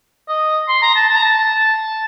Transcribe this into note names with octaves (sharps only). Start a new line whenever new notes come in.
D#5
C6
A#5
A5
A5
A#5
A5